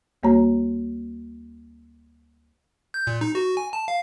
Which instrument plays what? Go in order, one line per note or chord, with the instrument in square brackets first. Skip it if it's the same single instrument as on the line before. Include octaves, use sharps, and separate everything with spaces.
[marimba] D2 G3 A#3 F#4 C#5 A#5
[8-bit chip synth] G6
A#2
D#4
F#4
G#5
A5
F5